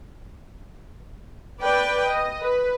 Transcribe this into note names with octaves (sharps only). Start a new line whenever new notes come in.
B4 D5 G5
D#5
B4